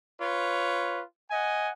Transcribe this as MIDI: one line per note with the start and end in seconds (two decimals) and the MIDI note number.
0.21 1.03 65
0.21 1.03 71
0.21 1.03 73
1.31 1.71 75
1.31 1.71 78
1.31 1.71 80